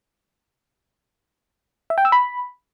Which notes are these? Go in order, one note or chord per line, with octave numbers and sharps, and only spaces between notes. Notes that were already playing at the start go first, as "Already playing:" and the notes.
E5
G5
E6
B5